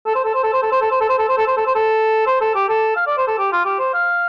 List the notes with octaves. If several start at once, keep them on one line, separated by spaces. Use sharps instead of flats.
A4
C5
A4
C5
A4
C5
A4
C5
A4
C5
A4
C5
A4
C5
A4
C5
A4
C5
A4
C5
A4
G4
A4
F5
D5
C5
A4
G4
F4
G4
C5
F5